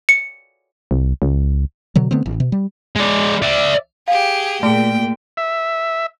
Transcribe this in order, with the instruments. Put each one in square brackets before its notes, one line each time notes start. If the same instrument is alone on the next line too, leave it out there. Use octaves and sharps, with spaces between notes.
[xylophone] C#7
[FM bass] C2
C#2
[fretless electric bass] B2 D3 F#3
D3 A3 B3 C4
A1
B2
G3
[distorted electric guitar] G#3 D5
D5 E5
[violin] G4 G#4 [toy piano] F5
[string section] A#2 [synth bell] A3 [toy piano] G#4 A5 [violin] G5
[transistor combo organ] E5